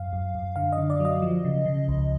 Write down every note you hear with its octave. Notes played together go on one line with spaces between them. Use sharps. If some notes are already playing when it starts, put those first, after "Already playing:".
Already playing: F#2 F5
F#2
F#2
D3 F5
D#5
D3
D5
F#3 D#5
F3
C#3
C#3
C#2